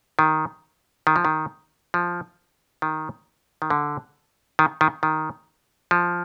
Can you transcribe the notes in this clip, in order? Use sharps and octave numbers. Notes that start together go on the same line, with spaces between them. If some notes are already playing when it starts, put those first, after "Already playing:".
D#3
D#3
F3
D#3
F3
D#3
D#3
D3
D#3
D#3
D#3
F3